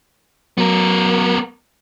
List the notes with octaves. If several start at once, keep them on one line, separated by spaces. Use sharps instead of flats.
F#3 B3 F#4 A#4